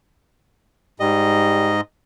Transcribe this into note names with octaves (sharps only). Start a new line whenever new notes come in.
G#2 G3 D#5